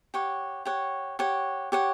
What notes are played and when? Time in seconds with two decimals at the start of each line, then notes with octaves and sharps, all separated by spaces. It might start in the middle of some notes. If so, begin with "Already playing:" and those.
0.14 G4 C#5 F#5
0.65 G4 C#5 F#5
1.19 G4 C#5 F#5
1.72 G4 C#5 F#5